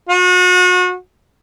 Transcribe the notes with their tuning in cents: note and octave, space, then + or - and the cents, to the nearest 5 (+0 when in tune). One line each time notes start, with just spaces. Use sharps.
F#4 -35